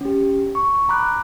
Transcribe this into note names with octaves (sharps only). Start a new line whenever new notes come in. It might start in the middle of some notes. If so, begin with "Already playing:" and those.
C#4 G4
C#6
A#5 B5 D6 F#6